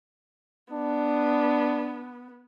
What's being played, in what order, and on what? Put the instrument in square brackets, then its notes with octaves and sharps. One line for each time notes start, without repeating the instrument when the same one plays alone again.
[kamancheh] B3 [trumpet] D4